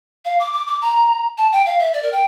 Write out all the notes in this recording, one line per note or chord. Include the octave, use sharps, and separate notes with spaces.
F5
D6
D6
D6
A#5
A5
G5
F5
E5
D5
A#4
G5